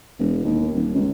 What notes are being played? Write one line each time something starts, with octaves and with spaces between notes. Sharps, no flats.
E1
D#2
D#1
C#2